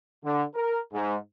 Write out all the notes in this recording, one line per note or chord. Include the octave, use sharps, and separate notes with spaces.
D3
A#4
G#2